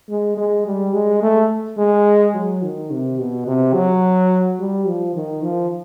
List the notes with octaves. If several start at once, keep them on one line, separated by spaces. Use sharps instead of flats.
G#3
G#3
G3
G#3
A3
G#3
F#3
D#3
C3
B2
C3
F#3
G3
F3
D#3
F3